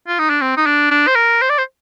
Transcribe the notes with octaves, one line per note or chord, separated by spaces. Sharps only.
F4
D#4
D4
C4
D#4
D4
D4
C5
A#4
C5
D5
C5